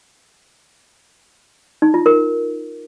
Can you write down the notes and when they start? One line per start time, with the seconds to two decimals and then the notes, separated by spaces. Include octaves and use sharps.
1.82 D#4
1.94 F4
2.06 A#4